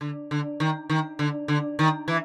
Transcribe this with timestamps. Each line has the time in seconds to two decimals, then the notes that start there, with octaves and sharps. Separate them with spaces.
0.01 D3
0.31 D3
0.60 D#3
0.90 D#3
1.19 D3
1.48 D3
1.79 D#3
2.08 E3